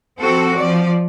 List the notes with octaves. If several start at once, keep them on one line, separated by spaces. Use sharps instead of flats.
F3 C4 F#4 A4
F3 D5